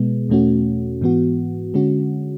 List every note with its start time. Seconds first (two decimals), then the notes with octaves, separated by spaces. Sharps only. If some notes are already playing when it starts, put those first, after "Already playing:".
Already playing: B2 G#3 B3
0.29 E2 B2 A3 C#4 F#4
1.01 G#2 E3 B3 F#4
1.74 D3 G#3 C#4 F#4